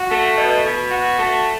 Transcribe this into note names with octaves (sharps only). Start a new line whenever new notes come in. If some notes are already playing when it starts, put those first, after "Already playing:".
Already playing: F#4
A3
B2
B2
F#4
A3